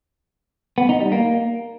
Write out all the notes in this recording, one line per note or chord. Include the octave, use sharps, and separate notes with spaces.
B3
D#4
G3
A#3